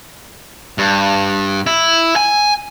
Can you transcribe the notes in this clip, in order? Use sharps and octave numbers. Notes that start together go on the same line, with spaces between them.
G2
E4
G#5